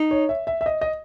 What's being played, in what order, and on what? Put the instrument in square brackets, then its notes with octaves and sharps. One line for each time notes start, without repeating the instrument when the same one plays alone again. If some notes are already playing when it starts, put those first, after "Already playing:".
Already playing: [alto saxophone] D#4
[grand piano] C#5
E5
E5
E5
D#5
D#5